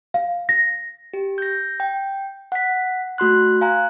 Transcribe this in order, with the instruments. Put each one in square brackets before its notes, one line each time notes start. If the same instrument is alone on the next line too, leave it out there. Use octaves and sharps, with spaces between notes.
[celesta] F5
A#6
[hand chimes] G4
G6 A#6
G5
F#5 B6
A3 F#4 C6 F#6
F5 G#5 A#5 F#6